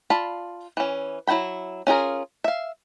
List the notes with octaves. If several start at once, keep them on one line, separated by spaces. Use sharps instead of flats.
F4 D5 A5 B5
E3 C#4
F#3 E4 F#4 G5 B5
C#4 F4 G#4 A#4
E5 F5